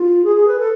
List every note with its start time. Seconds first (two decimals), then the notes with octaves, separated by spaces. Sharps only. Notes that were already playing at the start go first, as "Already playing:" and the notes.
Already playing: F4
0.24 G#4
0.35 G#4
0.48 B4
0.59 A4